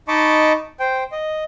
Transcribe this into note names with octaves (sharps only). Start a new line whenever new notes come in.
D#4 D#5 A5 B5 C#6 D6
C5 G5
D#5